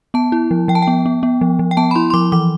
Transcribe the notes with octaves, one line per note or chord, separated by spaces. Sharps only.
B3 A5
E4
F3
F3 G5
A5
G5
B3
B3
B3
F3
F3
G5
B3 A5
B5
E4 C6
C6
F3 D6
E3 D6